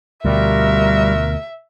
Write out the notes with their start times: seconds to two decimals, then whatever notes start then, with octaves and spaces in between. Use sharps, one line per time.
0.25 D2 B2 G3 F4 F#4 A#4 E5